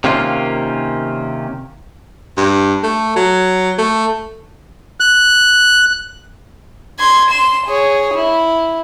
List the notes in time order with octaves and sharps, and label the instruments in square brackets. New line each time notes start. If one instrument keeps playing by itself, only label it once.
[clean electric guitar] C3 D#3 A#3 C#4 F4
[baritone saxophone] G2
A3
F#3
A3
[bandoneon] F#6
[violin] C6 G#6
C6 E7
G#4 C#5
E4